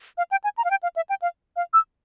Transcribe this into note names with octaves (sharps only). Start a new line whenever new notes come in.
F5
G5
G#5
A#5
F5
G5
F5
E5
G5
F5
F5
E6